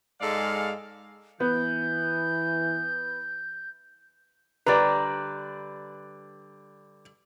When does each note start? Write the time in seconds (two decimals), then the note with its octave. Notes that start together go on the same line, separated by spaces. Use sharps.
0.21 G#2 G#3 A4 D5 F5
1.40 E3 B3 G6
4.66 D3 G3 B4 D5 A#5